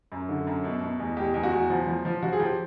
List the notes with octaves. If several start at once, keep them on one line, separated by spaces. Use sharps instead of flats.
F#2
D3
F#2
B2
B2
E2
E2 G4
E2
F#4
E2
F3
F3
F3
F3 F#4
G#4
F3 G4